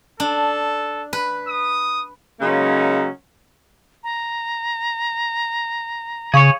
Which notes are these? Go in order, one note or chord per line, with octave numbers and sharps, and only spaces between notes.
D4 A4
B4
D#6
C#3 F#3 G#3 A#3 C#4 D#4
A#5
C#3 G#4 C#5 F5 C#6